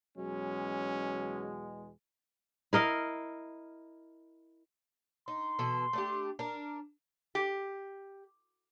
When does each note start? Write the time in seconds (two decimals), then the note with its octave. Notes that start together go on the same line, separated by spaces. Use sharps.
0.18 E2 B2 F#3 G#3 C#4
2.73 E4 A#4 D#5 F5
5.28 D#4 C6
5.59 B2 E3 A4
5.93 A3 D4 G4
6.39 D4 A#4
7.35 G4